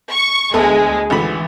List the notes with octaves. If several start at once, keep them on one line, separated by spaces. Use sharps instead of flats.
C#6
D2 G#3 A3 B3 A4
G#1 D3 E3 B5